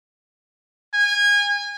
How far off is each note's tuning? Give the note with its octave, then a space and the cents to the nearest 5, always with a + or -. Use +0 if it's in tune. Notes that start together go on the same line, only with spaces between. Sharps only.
G#5 -25